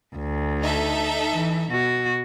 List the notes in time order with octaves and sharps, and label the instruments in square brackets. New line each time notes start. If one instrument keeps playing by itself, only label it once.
[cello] D2
[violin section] D#4 A4 E5
[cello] E3
B2 F#4